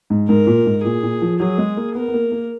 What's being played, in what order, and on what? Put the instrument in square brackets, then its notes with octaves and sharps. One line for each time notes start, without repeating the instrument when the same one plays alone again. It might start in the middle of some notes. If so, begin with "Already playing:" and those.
[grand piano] G#2
[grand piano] G#2 [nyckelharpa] A#4
[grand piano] A#2
G#2
[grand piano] A#2 [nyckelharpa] G#4
[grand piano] A#2
F3
[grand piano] F#3 [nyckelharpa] G#4
[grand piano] G#3
A#3
[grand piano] B3 [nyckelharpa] A#4
[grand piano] B3
A#3
A#3